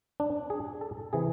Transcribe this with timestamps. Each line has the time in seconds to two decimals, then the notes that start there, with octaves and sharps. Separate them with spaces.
0.20 D4
0.50 G#4
0.81 A4
1.13 C3 E3 G#4